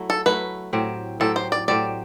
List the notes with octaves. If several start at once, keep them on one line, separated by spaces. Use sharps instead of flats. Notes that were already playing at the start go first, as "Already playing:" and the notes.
Already playing: F#3 A3 E4
A4
F#3 A3 E4 B4
A2 F#3 C4 G4
A2 F#3 C4 G4 A4
C5
D5
A2 F#3 C4 G4 D5